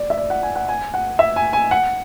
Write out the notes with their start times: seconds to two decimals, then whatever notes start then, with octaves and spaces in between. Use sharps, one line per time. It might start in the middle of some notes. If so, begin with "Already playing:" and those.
Already playing: D5
0.10 E5
0.17 D5
0.30 F#5
0.43 G#5
0.55 F#5
0.69 G#5
0.94 F#5
1.19 E5
1.36 G#5
1.53 G#5
1.71 F#5